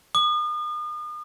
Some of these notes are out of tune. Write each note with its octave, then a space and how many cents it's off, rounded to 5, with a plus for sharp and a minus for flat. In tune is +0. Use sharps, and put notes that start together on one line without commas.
D#6 -40